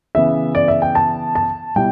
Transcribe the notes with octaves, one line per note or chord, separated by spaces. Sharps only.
C#3 E3 B3 E5
D5
E5
G5
A5
A5
B2 G3 E4 G5